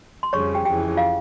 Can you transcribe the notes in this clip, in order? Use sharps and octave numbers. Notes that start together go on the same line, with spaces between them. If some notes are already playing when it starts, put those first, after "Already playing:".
C6
F2 C#3 G3 C#5 C#6
G4 G5
F2 C#3 E3 G4 G5
F4 F5